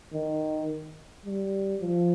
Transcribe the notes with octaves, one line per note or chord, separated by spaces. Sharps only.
D#3
G3
F3